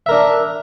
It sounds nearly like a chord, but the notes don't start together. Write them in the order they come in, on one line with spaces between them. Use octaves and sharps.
E5 A#4 D4